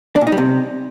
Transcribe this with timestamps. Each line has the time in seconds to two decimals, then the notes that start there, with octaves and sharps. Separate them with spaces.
0.16 D4
0.21 A#2
0.27 D#4
0.32 G3
0.38 C3